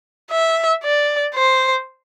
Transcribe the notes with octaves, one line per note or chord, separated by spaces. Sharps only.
E5
D5
C5